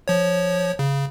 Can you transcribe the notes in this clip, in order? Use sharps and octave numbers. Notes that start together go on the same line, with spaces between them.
F3 C#5
C#3